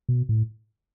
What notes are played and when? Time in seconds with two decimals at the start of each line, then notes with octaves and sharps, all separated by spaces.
0.09 B2
0.29 A2